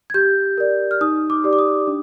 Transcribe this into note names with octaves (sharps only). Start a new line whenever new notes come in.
G#6
G4 G6
A#4 D5
F6
D#4 D#6
D6
G4 D5
D6
D#6
D4